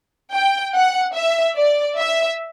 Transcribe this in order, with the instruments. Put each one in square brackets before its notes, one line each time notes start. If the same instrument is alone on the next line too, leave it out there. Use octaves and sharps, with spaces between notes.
[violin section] G5
F#5
E5
D5
E5